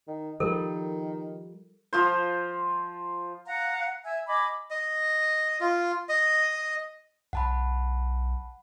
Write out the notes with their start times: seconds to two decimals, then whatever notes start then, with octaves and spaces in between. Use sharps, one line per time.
0.07 D#3
0.40 D#3 F3 G3 A4 A#4
1.93 F3 F4 C5
3.46 F5 F#5 A#5
4.05 E5 G#5 E6
4.27 D#5 G#5 B5 D6
4.71 D#5
5.61 F4
6.09 D#5
7.33 B1 F#5 A5 B5